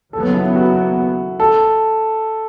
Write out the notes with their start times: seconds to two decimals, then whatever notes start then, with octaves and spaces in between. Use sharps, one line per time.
0.13 D#2 C#3 F#3 B3 A4
0.34 E4
0.56 F#4
1.40 A4